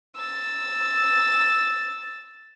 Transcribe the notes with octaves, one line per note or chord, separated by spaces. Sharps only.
E6 A6